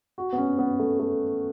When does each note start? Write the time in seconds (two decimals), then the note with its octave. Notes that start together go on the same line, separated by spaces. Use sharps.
0.18 F#4
0.33 B3
0.38 C#4
0.58 B3
0.79 A3
1.00 A3